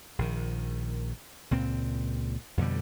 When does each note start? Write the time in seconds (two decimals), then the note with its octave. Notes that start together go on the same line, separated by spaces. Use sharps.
0.19 A#1 D#3
1.51 C#2 A#2 C4
2.57 F2 B2 D3 G3